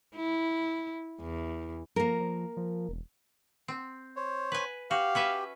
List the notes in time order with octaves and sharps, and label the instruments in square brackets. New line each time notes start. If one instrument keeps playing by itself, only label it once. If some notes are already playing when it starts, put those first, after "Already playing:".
[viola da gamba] E4
E2
[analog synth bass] F3 [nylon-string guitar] A#3 A#4
[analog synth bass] F3
F3
E1
[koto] C4
[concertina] C5 C#5
[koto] B4 G#5
[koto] F#4 [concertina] G4 [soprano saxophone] F5
[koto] C#4 B4 E5